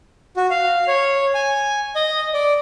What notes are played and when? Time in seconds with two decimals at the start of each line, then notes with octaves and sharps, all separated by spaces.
0.37 F#4
0.50 F5
0.88 C#5
1.34 G#5
1.96 D#5
2.34 D5